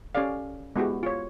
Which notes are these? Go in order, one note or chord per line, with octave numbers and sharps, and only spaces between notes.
C#4 G4 A4 D5 F5
G#3 B3 E4 F#4 G4
F4 C#5